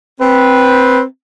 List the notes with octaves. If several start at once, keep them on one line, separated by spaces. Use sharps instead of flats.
C4 B4